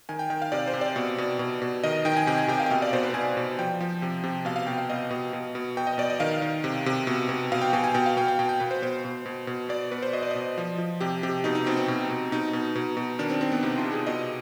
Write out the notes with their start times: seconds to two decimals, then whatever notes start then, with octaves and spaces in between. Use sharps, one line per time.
0.09 D#3 G#5
0.19 G5
0.30 D#3 G5
0.42 F5
0.52 C3 D5
0.67 C5
0.74 C3
0.81 D5
0.96 B2
1.18 B2
1.39 B2
1.62 B2
1.84 D#3 D#5
2.05 D#3 G5
2.17 G#5
2.27 C3 G5
2.38 G#5
2.48 C3 G5
2.60 F5
2.66 G5
2.70 B2 F5
2.82 D5
2.93 B2 C5
3.03 B4
3.14 B2 G#5
3.37 B2
3.59 F3 G5
3.81 F3
4.02 C3
4.23 C3
4.45 B2 F5
4.56 F5
4.67 B2 G5
4.78 F5
4.90 B2 D#5
5.10 B2
5.33 B2
5.55 B2
5.77 B2 G5
5.87 D#5
5.98 B2 D5
6.10 D#5
6.20 D#3 F5
6.42 D#3
6.64 C3
6.86 C3
7.07 B2
7.29 B2
7.52 B2 F5
7.62 G5
7.73 B2 G#5
7.84 G#5
7.94 B2 G5
8.06 F5
8.17 B2 G5
8.28 G5
8.39 B2 G5
8.49 G5
8.60 B2 B4
8.71 C5
8.82 B2 C5
9.05 B2
9.26 B2
9.47 B2
9.69 B2 D5
9.91 B2 B4
10.02 C5
10.13 B2 D#5
10.23 D5
10.31 B2 D#5
10.58 F3
10.78 F3
11.00 C3 G4
11.23 C3 G4
11.44 B2 D#4
11.55 D#4
11.66 B2 C4
11.77 C4
11.88 B2
12.10 B2
12.32 B2 D#4
12.53 B2
12.75 B2
12.97 B2
13.19 D#3 D4
13.29 C4
13.41 D#3 C4
13.52 B3
13.62 C3 D#4
13.78 F4
13.85 C3
13.92 G#4
14.07 B2 D#5